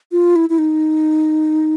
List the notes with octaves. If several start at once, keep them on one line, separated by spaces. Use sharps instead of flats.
F4
E4
E4
D#4